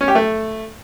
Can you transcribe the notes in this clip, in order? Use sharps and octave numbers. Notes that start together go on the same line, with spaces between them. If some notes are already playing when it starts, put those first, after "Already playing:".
C#4
G4
A3